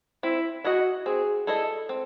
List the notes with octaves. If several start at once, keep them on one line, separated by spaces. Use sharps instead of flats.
C4 E4
E4 F#4 G#4 D#5
C4 G#4
E4 G#4 A4 D#5
C4